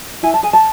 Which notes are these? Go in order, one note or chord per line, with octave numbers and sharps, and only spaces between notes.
E4 G#5
A5
G#4 G#5
A5